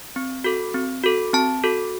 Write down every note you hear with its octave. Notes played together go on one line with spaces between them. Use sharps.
C4
F#4 A4
C4
F#4 A4
C4 A5
F#4 A4